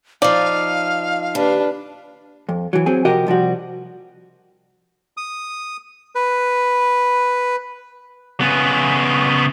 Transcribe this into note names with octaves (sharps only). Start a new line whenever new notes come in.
F3 D#4 D5 F5
D#2 D4 B4
F2
E3 F#3
F#3 C4 G#4
C3 F3 F#4 G4 A#4 D#5
C2 F3 G3 F#4
D#6
B4
C#3 B3